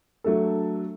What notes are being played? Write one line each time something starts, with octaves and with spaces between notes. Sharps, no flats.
F#3 A3 D4 A4